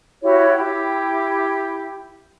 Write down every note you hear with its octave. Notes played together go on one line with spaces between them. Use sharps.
E4 F#4 G4 C#5
E4 G4